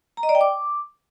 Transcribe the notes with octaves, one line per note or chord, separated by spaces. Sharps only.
A#5
D#5
D5
G5
D6